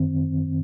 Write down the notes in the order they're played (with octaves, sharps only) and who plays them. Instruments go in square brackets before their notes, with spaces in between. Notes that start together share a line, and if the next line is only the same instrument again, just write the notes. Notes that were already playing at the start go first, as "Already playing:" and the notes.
Already playing: [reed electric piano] F#2 D#3 C4